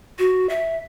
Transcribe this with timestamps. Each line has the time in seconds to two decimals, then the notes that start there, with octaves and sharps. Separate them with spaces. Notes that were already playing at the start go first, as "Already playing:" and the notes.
0.19 F#4
0.49 E5